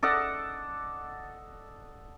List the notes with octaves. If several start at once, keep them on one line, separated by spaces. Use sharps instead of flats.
A4 D5 D#5 F#5